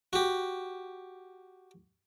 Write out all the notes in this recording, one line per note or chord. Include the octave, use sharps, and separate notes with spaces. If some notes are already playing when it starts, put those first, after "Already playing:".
F#4 G4